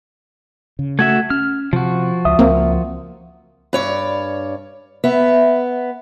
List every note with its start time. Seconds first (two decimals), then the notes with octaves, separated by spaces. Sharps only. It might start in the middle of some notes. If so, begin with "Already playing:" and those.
0.79 C#3
0.99 A3 F#4 E5 G#6
1.30 C#4 F6
1.73 C3 F3 F#4
2.25 C#2 E5 D#6
2.39 C#2 A#3 C4
3.73 G2 C#5 D5
5.04 B3 E5